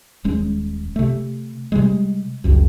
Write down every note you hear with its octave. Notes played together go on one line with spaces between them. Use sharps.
D#1 G#3 C#4
C3 A3
C3 G3 G#3
G1 C#2 F#2